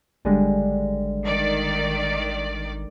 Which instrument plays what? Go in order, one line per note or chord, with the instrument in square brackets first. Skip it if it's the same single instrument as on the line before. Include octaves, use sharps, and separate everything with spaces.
[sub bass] G#1 [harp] D3 G3 G#3
[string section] D#3 D5